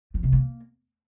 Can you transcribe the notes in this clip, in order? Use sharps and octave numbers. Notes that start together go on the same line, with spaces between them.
F3
C3
A#3